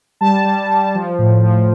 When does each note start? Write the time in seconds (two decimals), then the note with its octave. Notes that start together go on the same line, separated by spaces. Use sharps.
0.21 G3 A5
0.45 G3
0.70 G3
0.95 F3
1.19 A2
1.43 F3